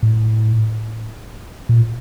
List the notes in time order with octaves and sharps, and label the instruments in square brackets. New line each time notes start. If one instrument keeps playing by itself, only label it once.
[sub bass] A2
A#2